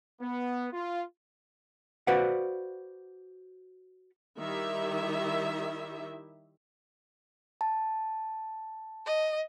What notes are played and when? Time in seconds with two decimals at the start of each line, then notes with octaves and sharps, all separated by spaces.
0.21 B3
0.73 F4
2.07 F#4 B4 C5 D5 F5 F#5
4.38 D#3 G3 E4 G4 E5
7.61 A5
9.06 D#5